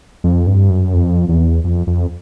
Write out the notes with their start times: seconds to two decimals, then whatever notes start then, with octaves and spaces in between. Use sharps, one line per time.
0.24 F2
0.47 G2
0.70 F#2
0.94 F2
1.29 E2
1.64 F2
1.87 F2